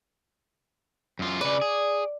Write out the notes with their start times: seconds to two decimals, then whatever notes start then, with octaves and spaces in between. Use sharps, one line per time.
1.19 F#2 F4
1.41 C#3 B4 D5
1.62 G#4